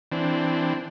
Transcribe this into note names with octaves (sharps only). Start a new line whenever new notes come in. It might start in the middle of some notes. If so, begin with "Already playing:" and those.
E3 C4 D4